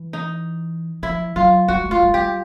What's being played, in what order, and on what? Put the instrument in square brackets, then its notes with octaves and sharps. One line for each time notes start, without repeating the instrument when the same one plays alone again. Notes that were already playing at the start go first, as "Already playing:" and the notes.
Already playing: [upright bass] E3
[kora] D#4
[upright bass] F3 [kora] E4
[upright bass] F#3 [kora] F4
[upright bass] G3 [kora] F#4
[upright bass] A3
[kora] F4
[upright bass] G3
[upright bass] G3 [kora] G4